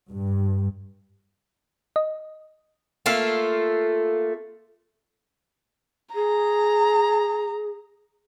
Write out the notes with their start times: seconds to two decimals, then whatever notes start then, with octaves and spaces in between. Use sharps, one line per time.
0.11 G2
1.96 D#5
3.06 A3 A#3 F4 A4
6.15 G#4 A#5